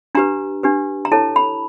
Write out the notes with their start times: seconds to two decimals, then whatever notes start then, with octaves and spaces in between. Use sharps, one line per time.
0.15 D4 G4 B4 A#5
0.63 D4 G4 B4
1.05 A#5
1.12 E4 A4 C#5 A5
1.36 B5